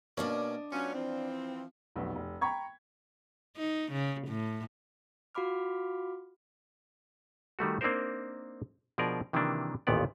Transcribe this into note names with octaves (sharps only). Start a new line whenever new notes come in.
B2 A#3 C#4 D4 D5 D#5
F#3 B3 C#4 F4
E3 F3 C4
F1 B1 B2
F1
G5 A#5 B5 C#6 G#6
D#4
C#3
A2
F4 F#4 F5 B5 D6 F6
D#3 G3 A3 F#4
A#3 C4 D4 D#4 A#4 C5
B2 F3 D4 G#4 A#4 D5
C3 D#3 E3 F#3 A#3 D4
A1 D#2 A#2 D#3 B3 D5